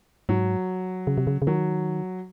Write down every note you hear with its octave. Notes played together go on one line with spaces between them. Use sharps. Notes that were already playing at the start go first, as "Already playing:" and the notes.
G#2 F#3
C#3
C3
C#3
C#3
D#3 F#3